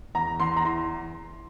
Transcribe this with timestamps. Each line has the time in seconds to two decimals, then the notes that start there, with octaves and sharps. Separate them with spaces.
0.15 E2 A#5
0.40 E2 C6
0.56 A#5
0.65 E3 C6